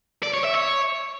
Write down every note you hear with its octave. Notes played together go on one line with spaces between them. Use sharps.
D5
C#5
E5
C#5